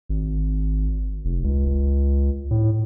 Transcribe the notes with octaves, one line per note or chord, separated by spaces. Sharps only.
G#1
F1
C#2
A2